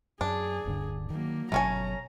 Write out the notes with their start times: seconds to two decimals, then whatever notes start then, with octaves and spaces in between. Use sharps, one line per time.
0.21 F#2 D4 G#4
0.65 D1 G2 D3
1.10 D#3 F#3 A#3
1.52 G1 B2 F#3 A3 C#4 G#5 A#5